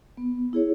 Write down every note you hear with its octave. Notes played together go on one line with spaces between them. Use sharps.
B3
E4 G#4 C#5